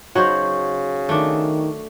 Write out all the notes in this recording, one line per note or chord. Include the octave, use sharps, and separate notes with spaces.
C#3 F#3 D#4 F#4 C5
D#3 A3 D4